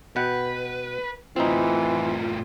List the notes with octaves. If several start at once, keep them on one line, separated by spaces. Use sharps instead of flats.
B2 B4 F#5 G5
A2 E3 C4 D#4 F4